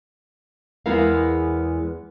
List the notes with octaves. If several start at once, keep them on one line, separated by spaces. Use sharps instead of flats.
E2 G#3 B3 E4 A#4 F5